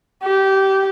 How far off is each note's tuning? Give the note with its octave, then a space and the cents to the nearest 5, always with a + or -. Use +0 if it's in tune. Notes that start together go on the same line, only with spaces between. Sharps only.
G4 -20